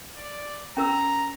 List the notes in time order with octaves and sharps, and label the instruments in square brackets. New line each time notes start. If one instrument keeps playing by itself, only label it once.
[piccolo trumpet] D5
[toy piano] C#4 A#4 E6 [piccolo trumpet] A#5